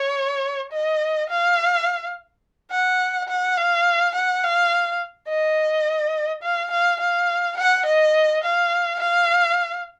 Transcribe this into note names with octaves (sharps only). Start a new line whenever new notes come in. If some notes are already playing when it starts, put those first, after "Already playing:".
Already playing: C#5
D#5
F5
F#5
F#5
F5
F#5
F5
D#5
F5
F5
F5
F#5
D#5
F5
F5